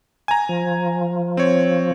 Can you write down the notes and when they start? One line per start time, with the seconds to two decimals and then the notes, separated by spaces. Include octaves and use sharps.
0.28 G#5 A#5
0.49 F3
1.37 C4 C#5